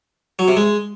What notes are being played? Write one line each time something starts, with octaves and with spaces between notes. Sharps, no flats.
F#3
C3
G#3